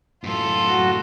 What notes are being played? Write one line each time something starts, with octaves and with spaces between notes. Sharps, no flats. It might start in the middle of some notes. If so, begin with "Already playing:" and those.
F#2 A2 F4 A4
F#4